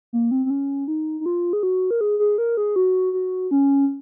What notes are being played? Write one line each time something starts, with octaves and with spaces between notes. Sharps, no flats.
A#3
C4
C4
C#4
D#4
D#4
F4
G#4
F#4
A#4
G#4
G#4
A#4
G#4
F#4
F#4
C#4